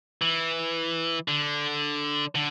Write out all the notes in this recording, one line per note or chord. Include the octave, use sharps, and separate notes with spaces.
E3
D3
D3